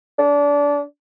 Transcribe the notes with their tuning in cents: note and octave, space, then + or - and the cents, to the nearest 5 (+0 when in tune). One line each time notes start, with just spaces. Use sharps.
D4 -25